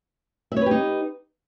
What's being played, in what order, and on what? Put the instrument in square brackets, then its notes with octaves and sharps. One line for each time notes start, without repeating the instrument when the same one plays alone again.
[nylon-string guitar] E5
C#5
B4
G4
D#4